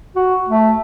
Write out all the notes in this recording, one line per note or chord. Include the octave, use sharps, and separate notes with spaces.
F#4
A3